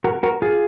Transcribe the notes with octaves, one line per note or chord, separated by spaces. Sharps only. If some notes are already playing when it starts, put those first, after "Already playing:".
F#4 A#4
F#4 A#4
F4 G#4